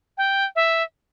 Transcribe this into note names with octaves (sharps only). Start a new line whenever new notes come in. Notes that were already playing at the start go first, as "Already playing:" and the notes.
G5
E5